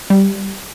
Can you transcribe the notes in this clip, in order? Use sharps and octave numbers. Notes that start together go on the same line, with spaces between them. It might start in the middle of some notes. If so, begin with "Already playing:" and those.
G3